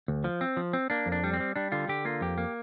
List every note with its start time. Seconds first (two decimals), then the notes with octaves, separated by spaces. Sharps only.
0.08 D2
0.24 F3
0.41 C4
0.57 F3
0.73 C4
0.90 A#3 D4
1.06 F2
1.12 D4
1.24 G3
1.33 C4
1.40 G3
1.56 G3 D4
1.72 D3 F4
1.89 D3 G4
2.05 A#3 F4
2.21 F2 G4
2.38 A#3